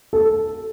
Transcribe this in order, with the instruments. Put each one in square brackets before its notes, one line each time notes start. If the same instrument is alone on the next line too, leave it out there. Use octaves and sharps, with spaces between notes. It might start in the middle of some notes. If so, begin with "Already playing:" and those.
[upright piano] A4